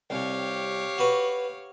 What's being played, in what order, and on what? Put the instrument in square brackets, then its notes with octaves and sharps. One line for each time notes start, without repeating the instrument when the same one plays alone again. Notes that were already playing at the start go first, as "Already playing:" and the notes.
[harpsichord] C2 [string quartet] G4 C#5 F5
[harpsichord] F#4 B4